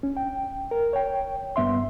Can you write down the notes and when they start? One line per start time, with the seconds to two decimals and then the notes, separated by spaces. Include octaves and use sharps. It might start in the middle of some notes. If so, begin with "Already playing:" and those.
0.03 C#4
0.17 G5
0.71 A#4
0.93 C#5 G5
1.56 G2 B3 E5 C6